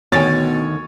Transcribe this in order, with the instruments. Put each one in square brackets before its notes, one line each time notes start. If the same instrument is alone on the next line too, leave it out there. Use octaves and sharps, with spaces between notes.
[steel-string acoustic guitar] D2 D3 D#3 [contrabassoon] B2 [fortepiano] C#5 G#5 [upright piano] A6